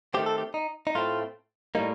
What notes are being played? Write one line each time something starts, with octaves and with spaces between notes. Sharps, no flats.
D#3 A3 C4 G4
A4
G4
D#4
D#4
A2 A3 C4 F4
A2 G3 A#3 D#4